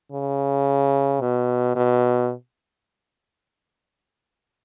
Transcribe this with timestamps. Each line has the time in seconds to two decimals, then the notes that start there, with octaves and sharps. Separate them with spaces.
0.12 C#3
1.21 B2
1.76 B2